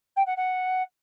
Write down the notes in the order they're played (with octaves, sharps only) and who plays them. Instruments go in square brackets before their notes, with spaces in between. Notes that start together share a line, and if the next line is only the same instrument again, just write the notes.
[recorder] G5
F#5
F#5